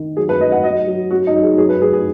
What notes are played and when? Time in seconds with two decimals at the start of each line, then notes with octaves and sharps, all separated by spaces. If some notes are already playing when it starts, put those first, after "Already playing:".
Already playing: D#3
0.17 F#3 G#4
0.29 B4
0.41 F#3 D#5
0.52 F#5
0.64 F#3 D#5
0.87 F#3
1.11 F#3 F#4
1.27 D#4
1.35 F#3
1.43 G#4
1.58 F#3 G#4
1.69 B4
1.82 F#3 G#4
1.93 G#4